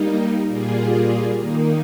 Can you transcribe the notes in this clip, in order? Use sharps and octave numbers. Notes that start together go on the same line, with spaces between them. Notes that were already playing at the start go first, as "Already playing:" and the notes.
Already playing: G3 A#3 D#4
A#2 G3 A#3 F4 G#4
D#3 A#3 D#4